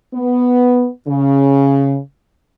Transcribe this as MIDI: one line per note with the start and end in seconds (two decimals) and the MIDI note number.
0.14 0.88 59
1.08 1.97 49